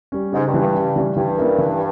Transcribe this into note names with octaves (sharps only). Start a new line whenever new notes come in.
G3 C#4
G#2 C#3
G2
E3 G3 C#4
G2
C#3
E3 G3 C#4
G2 E3
A#3 C#4 E4 A#4
E3